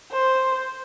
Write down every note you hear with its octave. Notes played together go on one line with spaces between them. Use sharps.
C5